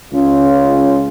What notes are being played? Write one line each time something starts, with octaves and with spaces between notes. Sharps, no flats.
C#2 C#4 F4